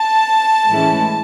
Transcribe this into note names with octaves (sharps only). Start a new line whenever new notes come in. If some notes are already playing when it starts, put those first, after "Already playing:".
Already playing: A5
A2 E3 G#3 C#4 E4